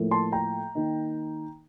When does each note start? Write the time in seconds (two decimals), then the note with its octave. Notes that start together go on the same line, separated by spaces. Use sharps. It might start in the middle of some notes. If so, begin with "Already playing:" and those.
Already playing: A2 F3 A#3
0.11 A5 C6
0.32 G5 A#5
0.75 D#3 A#3 D#4